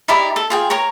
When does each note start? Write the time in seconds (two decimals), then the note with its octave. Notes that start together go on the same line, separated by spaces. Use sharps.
0.08 D#4 E4 G4 D5
0.36 A4
0.50 F4 G#4 G5
0.70 A#4 C#5 A#5